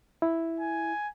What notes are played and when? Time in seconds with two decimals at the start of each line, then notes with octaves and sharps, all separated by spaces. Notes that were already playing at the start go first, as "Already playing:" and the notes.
0.22 E4
0.60 G#5